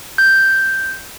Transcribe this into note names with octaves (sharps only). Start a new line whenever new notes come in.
G6